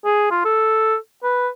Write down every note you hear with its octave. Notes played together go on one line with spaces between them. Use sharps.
G#4
F4
A4
B4